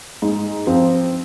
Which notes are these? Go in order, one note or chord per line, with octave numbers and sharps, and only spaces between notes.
G#2
F3 C4